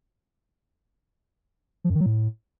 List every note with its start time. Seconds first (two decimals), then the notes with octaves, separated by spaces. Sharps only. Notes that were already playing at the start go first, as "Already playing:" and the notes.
1.84 F3
1.90 F#2
1.95 D#3
2.01 F#3
2.06 A2